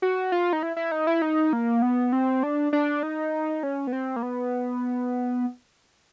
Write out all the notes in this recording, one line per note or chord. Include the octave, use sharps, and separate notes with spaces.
F#4
F4
D#4
E4
E4
D#4
E4
D#4
A#3
B3
C4
D4
D4
D#4
C#4
B3
C4
A#3
B3